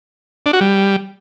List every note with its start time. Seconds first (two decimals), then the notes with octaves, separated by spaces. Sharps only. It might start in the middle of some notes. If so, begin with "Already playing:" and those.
0.46 D4
0.53 F#4
0.61 G3